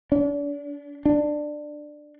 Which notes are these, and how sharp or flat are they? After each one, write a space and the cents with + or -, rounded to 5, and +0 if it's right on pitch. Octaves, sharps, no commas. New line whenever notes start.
D4 -35
D4 +15